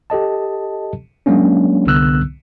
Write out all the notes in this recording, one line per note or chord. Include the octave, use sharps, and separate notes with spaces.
G4 A4 D#5 A5
F#3 G#3 A#3 C#4 D4
C2 D3 B3 E6 F#6